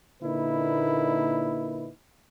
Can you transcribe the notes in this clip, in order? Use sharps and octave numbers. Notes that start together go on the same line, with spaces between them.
A#2 D3 A#3 D#4 E4 B4